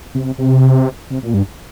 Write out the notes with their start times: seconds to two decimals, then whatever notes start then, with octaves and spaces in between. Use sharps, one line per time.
0.15 C3
0.38 C3
1.10 C3
1.23 A#2
1.34 G2